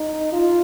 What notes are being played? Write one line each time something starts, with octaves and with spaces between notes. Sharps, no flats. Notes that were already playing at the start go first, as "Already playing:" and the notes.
Already playing: D#4
F4